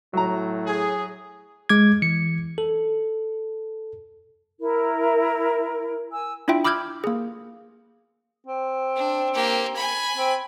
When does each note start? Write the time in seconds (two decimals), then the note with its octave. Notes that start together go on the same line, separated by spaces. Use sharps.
0.13 A2 F#3 A#5
0.67 G#4
1.69 G#3 D6 G#6
2.02 E3 C#7
2.58 A4
4.60 E4 A#4
6.12 G#5 E6
6.48 D4 E4 F4 E5 G5
6.64 B5 D6 E6 F6 G6 G#6
7.04 A#3 G#4
8.46 C4
8.96 D4
9.34 A#3 G4
9.76 G#5 B5
10.16 C4